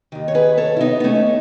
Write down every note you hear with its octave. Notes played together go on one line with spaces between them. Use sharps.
D#2 D#3
C#5
G#4 B4
A4 C#5
E4
B3 D#4
B3
D#2 D#3 A3 C#4